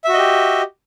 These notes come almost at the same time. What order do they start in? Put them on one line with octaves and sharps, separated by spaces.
E5 F#4 D#5 G4